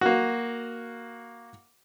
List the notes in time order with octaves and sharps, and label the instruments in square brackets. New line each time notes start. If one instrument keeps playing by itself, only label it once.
[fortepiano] A#3 F#4